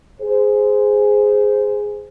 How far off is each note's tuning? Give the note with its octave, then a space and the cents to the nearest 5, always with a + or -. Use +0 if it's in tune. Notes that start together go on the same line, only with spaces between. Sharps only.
G#4 +0 C5 -15